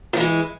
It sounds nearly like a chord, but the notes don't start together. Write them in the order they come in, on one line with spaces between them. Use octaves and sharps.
F3 E3 G#3